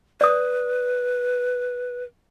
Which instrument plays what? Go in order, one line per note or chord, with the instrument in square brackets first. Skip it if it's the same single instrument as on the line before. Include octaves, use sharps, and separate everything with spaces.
[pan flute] B4 [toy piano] D5 D#6